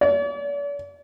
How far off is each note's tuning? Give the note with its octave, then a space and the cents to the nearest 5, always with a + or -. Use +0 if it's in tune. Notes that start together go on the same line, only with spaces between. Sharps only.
D5 -45